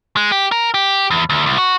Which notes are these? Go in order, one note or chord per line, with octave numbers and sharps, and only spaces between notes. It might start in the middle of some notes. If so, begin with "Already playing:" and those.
G#3
G4
A#4
G4
E2
D2
C2
F#4